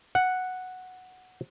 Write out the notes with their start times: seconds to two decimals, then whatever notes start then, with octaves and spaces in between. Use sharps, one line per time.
0.15 F#5